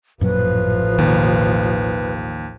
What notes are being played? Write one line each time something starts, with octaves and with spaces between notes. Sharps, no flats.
A1 F#2 A#2 F3 F#3 B4
D#2 B2 D#3